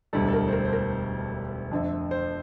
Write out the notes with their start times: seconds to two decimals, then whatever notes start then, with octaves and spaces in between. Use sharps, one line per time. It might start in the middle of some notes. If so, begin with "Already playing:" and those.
0.13 E1 D2 D3 G3 A4
0.28 A4
0.33 A#4
0.48 C5
0.52 A#4
0.65 C5
0.73 A#4
1.71 F2 D3 A3
2.11 C5